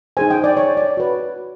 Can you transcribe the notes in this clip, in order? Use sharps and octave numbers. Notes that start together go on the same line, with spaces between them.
D#4 G#4 C5 G#5
G5
D5
C#5
D5
F#4 B4